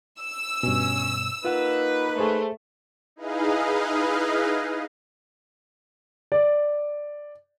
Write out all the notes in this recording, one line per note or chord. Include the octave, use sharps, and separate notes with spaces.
E6
G2 B2 C#4
A#3 D#4 F4 B4 F#5
A3 G#4 C5
D#4 E4 G#4 B4 D#5 F5
D5